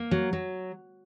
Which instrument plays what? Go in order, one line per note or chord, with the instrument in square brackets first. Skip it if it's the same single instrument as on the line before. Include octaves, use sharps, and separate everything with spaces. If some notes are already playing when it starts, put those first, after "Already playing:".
Already playing: [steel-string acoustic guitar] A#3
F#3
F#3